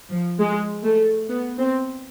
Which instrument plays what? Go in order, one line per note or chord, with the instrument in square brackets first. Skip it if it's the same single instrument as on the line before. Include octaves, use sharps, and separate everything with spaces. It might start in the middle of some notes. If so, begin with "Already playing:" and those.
[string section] F3
G#3
A3
B3
C4